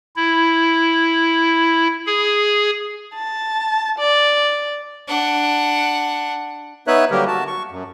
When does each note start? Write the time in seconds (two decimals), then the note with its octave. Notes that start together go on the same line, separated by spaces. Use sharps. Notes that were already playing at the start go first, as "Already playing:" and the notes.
0.16 E4
2.07 G#4
3.14 A5
3.99 D5
5.07 D4 F#5
6.87 B3 D#4 B4 C#5 E5 F#6
7.11 D3 F#3 G3 A#3 G4 A#4
7.27 F#4 A5
7.47 C#6
7.71 F#2